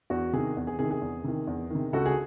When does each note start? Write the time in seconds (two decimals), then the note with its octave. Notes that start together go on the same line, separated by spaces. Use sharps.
0.10 E2 F#4
0.33 C3 D#3 G#4
0.57 E2
0.67 G#4
0.79 C3 D#3 G#4
0.90 G#4
1.02 E2
1.24 C3 D#3
1.47 E2
1.70 C3 D#3
1.93 C#2 F#4 A4
2.06 G#4